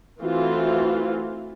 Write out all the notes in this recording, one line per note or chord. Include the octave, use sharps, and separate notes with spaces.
E3 A3 C4 F4 F#4